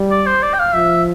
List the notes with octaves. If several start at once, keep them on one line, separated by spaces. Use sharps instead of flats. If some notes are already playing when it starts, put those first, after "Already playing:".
Already playing: G3
D5
C5
D5
G5
F5
F3 E5